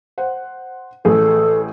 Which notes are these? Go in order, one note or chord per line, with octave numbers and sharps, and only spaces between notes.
C5 F#5
A1 A2 G#4 A4